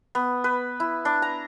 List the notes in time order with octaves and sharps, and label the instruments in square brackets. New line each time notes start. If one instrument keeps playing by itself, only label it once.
[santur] B3
B4
E4
D4
A#5